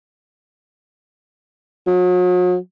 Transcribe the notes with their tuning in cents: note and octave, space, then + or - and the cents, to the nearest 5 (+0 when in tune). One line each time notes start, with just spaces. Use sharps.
F#3 -40